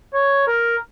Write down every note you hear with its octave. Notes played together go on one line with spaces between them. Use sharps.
C#5
A#4